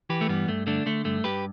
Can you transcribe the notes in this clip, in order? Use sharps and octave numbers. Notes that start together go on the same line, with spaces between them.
E3 G4 B4
A3
G2 G3 B3
G2 A3
D3 A3 D4
D3 A3
G2 A3
G2 G4 B4